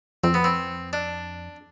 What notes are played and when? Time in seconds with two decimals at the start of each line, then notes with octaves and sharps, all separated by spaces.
0.24 F2 C4
0.34 B3
0.44 C4
0.93 D4